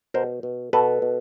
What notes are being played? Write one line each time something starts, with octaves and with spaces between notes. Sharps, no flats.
B2 A#4 C5
B2
B2 A4 B4
B2